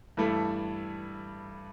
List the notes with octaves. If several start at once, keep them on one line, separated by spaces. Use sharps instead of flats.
G2 E3 A3 E4 A4